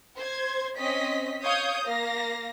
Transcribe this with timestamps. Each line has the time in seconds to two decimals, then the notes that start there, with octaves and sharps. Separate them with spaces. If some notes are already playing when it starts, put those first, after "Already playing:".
0.19 C5 G#6
0.77 C4 C#4 D#5 B6
1.43 C#5 F5 D#6 G6 G#6
1.85 A#3 F5 A#6